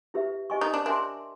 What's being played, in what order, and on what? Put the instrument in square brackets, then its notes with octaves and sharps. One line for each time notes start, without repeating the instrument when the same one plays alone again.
[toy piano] E4 G4 B4 E5
G4 C5 D#5 G#5 C#6
[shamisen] D#4
D4
[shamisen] D4 [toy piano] A#4 C#5 E5 G#5 C6